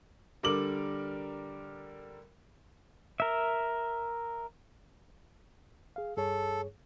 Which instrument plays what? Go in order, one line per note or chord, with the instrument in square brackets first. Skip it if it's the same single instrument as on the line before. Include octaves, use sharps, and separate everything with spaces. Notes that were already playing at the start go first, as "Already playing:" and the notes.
[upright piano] D3 G3 A#4 D6 F#7
[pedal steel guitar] A#4 E5
[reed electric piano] G#4 F5
[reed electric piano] G2 G#4 C#5 [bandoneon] A4